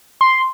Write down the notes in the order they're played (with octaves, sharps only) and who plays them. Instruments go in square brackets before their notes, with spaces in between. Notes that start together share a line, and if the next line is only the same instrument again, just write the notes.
[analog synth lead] C6